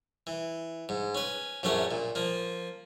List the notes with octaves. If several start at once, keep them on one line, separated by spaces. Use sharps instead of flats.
E3
G#2
C#4 B4
A#1 F#2 A3 C#4 F#5
A#2
F3 A#3